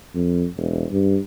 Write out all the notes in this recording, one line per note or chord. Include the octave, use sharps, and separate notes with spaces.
F2
E1
G2